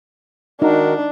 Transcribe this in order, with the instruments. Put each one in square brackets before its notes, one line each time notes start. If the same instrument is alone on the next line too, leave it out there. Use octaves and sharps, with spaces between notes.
[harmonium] D#3 F#4 A#4 [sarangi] D4 [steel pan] D#4